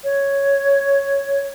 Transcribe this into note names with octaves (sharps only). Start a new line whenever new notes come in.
C#5